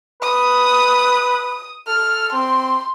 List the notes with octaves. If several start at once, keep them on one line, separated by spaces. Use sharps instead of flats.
B4 D#6
A4 F6
C4 C6